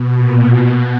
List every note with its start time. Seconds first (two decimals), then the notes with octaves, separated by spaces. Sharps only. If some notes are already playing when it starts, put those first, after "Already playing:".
Already playing: B2
0.16 A#2
0.46 B2